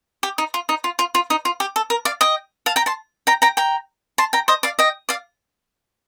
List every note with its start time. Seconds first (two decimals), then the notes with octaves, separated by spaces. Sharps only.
0.23 G4
0.38 D#4
0.54 F4
0.69 D#4
0.84 F4
0.99 F4
1.15 F4
1.30 D#4
1.45 F4
1.60 G4
1.76 A4
1.90 A#4
2.05 D5 F5
2.21 D#5 G5
2.66 F5 A5
2.76 G5 A#5
2.86 A5 C6
3.27 G5 A#5
3.42 G5 A#5
3.57 G5 A#5
4.18 A5 C6
4.33 G5 A#5
4.48 C5 D#5
4.63 D5 F5
4.79 D#5 G5
5.09 D5 F5